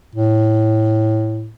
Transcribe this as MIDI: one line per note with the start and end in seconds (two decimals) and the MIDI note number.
0.15 1.49 45